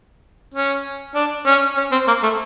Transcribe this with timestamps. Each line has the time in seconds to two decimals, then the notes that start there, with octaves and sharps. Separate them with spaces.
0.54 C#4
1.15 D4
1.46 C#4
1.77 C#4
1.92 C4
2.08 A#3
2.23 A3